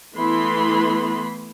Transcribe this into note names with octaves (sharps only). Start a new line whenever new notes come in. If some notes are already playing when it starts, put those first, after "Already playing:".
E3 A3 B3 E4 B5 C6